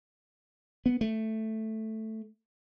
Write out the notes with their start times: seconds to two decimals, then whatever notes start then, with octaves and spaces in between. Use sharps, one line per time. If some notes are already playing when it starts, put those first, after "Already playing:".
0.86 B3
1.01 A3